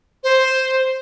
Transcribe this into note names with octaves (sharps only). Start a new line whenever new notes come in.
C5